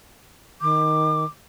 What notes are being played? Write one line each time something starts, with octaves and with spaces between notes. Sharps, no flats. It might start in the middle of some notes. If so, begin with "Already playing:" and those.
D#3 D6